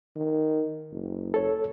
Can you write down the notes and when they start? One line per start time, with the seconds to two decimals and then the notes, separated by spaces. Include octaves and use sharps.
0.16 D#3
0.92 F#1
1.34 A4 C#5